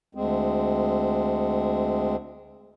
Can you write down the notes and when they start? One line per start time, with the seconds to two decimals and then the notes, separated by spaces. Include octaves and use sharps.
0.15 D2 G#3 C4